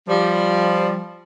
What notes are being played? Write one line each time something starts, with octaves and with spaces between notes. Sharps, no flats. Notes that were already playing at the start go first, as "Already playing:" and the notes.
F3 G3